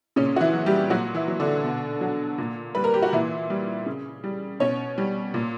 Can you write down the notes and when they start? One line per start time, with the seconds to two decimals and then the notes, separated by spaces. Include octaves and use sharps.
0.16 A#2 C#3 C#4
0.36 F#4
0.41 E3 E4
0.53 F#3
0.66 G3 G4
0.90 A#2 F#3 F#4
1.14 E3 E4
1.28 F#3
1.40 D3 D4
1.64 B2
2.01 F#3
2.38 A#2
2.75 G3 B4
2.84 A#4
2.94 G4
3.02 F#4
3.13 A#2 E3 E4
3.50 G3
3.86 C#3
4.24 G3
4.60 B2 C#4 C#5
4.98 G3
5.34 A#2